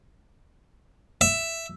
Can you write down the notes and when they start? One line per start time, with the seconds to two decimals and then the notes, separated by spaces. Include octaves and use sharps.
1.21 E5